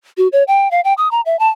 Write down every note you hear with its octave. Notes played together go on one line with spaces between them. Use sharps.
F#4
C#5
G5
F5
G5
D#6
A#5
E5
A5